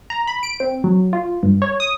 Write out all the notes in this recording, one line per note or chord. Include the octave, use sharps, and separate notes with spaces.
A#5
B5
D7
C4
F#3
F4
G2
C#5
D#6